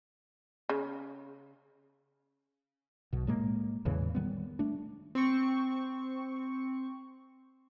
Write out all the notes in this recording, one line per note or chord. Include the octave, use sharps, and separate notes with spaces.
C#3
B1 B2
A2 G#3 A#3
E2 A2 C#3 E3
D#3 G3 B3
A3 D4
C4 C#6